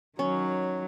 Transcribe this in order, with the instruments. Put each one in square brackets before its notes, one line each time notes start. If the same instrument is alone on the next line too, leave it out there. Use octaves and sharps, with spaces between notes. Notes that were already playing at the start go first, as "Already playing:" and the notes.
[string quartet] D#3 F#3 C#5 [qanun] C#4